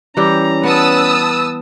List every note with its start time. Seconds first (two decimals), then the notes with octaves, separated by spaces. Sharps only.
0.17 E3 G3 C#4 G4 A#5
0.63 B3 B4 A5 D#6 E6